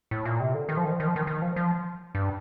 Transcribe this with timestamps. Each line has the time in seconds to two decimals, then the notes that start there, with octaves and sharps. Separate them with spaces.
0.11 A2
0.25 A#2
0.40 C3
0.54 D3
0.69 D#3
0.77 F3
0.85 D#3
0.92 F3
1.00 D#3
1.07 F3
1.16 D#3
1.27 D#3
1.42 F3
1.56 F3
2.15 G2